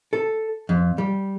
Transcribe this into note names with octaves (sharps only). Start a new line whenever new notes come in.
A4
F2
G3